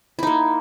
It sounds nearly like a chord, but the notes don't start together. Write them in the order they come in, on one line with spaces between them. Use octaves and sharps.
E4 D#4 A#3